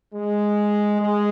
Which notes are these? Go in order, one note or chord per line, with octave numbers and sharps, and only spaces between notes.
G#3
G#3